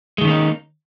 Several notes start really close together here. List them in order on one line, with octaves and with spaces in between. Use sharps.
G#3 D#3 C#4 A#3 D#4